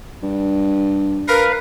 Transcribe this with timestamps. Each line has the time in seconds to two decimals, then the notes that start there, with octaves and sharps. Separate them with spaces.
0.23 G2
1.28 A#4 B4 F5